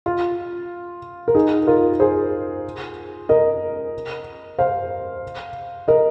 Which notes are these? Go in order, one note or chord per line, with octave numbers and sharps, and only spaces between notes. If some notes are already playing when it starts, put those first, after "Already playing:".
F4
A#4
D#4 G#4
F4 A#4
G#4 C5
A#4 D#5
C5 F5
A#4 D#5